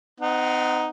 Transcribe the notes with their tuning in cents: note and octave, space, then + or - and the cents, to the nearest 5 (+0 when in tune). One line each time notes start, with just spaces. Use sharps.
C4 -40 D#4 +0 F#5 +0